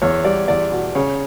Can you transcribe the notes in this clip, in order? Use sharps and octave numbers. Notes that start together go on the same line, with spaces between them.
E2 C#5
G3 D5
E2 D5
B2
C#3 C#5